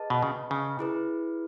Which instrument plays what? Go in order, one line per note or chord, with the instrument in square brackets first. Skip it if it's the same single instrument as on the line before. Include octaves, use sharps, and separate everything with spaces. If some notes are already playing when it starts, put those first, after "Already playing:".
Already playing: [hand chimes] G#4 B4 D#5 A5
[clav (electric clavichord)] B2
C#3
C#3
[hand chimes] E4 G#4 B4